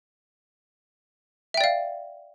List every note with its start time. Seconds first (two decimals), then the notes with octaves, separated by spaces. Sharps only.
1.54 E5
1.57 G5
1.61 D5
1.64 F5